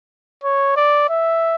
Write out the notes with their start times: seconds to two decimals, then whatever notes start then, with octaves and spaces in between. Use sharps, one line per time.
0.44 C#5
0.76 D5
1.09 E5